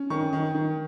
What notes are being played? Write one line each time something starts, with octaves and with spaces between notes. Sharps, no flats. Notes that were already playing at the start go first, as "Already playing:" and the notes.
Already playing: C#4
D#3 C#6
D#3
D#3